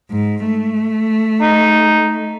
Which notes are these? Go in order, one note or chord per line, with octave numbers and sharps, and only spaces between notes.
G#2
A3
D#4